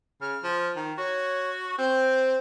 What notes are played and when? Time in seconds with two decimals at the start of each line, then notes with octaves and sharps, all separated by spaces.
0.21 C#3 F6
0.43 F3
0.76 D#3
0.98 F#4 C#5
1.78 C4 C5